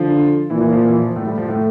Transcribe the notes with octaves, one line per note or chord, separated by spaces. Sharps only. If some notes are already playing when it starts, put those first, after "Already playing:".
Already playing: D3 F3 F4
A#2 E3 E4
E3 E4
F3 F4
E3 E4
F3
A2 A3
G3
F3
A2 A3